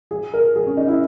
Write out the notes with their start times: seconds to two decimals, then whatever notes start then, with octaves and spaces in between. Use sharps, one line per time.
0.11 G#4
0.34 A#4
0.56 G#4
0.67 C#4
0.77 D#4
0.88 E4